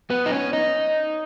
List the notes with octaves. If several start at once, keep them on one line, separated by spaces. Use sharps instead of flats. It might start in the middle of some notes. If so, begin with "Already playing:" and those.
B3
D#4
C#4
D#4